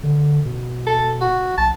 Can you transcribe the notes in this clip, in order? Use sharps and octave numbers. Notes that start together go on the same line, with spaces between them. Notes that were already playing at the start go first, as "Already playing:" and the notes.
D3
B2
A4
F#4
B1 A5